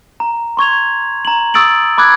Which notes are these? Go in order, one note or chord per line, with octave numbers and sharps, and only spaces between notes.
A#5
C6 C#6 G#6 F7
A#5 F#7
C#6 D#6 E6 A6 D7 F#7
B5 D6 F#6 G#6